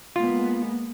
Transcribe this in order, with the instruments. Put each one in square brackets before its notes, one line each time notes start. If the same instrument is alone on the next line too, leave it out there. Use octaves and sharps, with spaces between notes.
[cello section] G#3 A#3 B3 [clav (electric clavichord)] F4